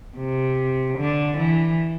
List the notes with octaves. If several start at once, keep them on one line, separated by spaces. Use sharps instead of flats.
C3
D3
E3